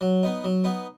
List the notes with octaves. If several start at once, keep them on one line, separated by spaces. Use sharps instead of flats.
F#3
B3 D#4
F#3
B3 D#4